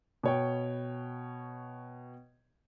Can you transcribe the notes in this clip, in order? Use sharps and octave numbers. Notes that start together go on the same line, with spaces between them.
B2 C#5 G5